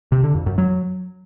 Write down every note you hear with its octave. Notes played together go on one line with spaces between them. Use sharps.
C3
D3
F2
F#2
F#3